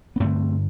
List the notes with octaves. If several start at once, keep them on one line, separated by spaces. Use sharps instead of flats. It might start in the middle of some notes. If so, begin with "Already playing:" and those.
B3
G2 D3 A3 C4